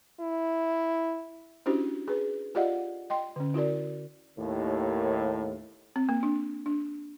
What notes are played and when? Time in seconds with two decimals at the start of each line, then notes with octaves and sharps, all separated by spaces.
0.20 E4
1.66 C#4 D4 E4 F#4 G4 C5
2.08 G#4 B4
2.55 F4 G4 D5 D#5 F5 F#5
3.10 D#5 G5 C6
3.36 D3 C#4
3.54 E4 F#4 A#4 D5
4.38 D#2 A2
5.96 C4
6.09 A#3
6.23 D4
6.66 D4